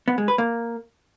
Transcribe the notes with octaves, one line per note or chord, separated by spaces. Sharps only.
B3
G#3
B4
A#3